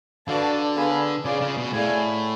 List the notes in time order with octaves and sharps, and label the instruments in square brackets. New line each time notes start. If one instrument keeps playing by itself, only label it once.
[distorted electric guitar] D3 [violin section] F#4 B4 D5 F5 A5
[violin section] B3 D4 G#4 B4 F5
[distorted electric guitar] C#3 [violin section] F4 G#4 D5
[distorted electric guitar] C#3
B2
[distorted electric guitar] A2 [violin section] G#4 D5 F5 G#5